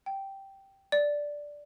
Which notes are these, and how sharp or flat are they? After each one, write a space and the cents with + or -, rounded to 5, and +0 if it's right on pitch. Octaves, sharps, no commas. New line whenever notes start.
G5 -5
D5 +0